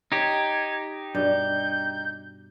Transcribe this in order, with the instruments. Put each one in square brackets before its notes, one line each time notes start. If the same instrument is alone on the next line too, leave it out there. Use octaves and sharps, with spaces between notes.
[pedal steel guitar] D#4 G4 [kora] C#5 [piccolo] G#6
[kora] G2 B2 D5 [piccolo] G6